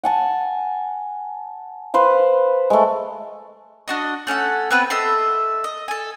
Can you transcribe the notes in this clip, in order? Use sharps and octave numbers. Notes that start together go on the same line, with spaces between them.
F#5 G#5 A5
B4 C5 F5
G#3 A3
D4 F#4 D#5
A3 C#4 A4 F#5
B3 C4 B4
A4 D#5 E5 C6
D#5
A4 G#5